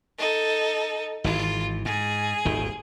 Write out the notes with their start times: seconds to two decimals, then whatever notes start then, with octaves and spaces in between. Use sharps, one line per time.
0.19 D#4 A4
1.24 G#1 E3 F4
1.85 G#2 G#4
2.45 D#1 G#1 D#3